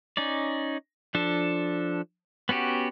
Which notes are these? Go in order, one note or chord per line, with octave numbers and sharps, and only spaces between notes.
C#4 D#4 D5
F3 D4 A4
B3 C#4 F#4 G4